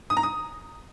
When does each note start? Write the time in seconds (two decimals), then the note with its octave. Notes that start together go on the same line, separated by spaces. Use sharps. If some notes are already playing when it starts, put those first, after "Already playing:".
0.10 D#6
0.17 A#5
0.23 D#6